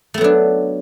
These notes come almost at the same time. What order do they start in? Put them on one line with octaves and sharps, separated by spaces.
A3 B3 F#3 D4